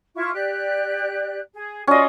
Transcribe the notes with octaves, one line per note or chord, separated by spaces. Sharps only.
E4 F4 C#6
G4 D5 F#6
G#4
C#4 F4 F#4 D5 D#5